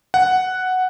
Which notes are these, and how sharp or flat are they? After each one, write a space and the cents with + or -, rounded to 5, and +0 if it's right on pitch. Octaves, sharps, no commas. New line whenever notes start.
F#5 +0